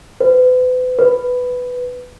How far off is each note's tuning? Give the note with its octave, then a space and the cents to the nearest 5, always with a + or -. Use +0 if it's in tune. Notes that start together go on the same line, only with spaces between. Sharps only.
B4 +40
B4 +5